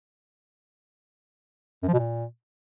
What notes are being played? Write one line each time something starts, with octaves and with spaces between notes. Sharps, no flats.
F#2
F3
B2
A#2